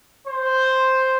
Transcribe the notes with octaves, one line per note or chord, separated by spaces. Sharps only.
C5